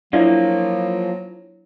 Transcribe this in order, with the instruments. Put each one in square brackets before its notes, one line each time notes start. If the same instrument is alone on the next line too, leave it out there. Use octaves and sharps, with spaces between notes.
[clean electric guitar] F3 A#3 F4 [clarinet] F#3 [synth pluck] D4 E4